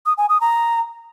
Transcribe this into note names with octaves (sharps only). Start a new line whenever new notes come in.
D#6
G#5
D#6
A#5